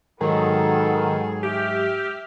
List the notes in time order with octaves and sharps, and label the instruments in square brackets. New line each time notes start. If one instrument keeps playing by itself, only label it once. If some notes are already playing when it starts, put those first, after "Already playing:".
[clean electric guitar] G#2 F#3 [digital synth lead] D#3 [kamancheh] B3 A4 [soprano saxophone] G#4
[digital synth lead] G4 [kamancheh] E5 F6